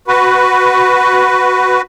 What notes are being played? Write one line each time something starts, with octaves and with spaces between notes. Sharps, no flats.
F#4 B4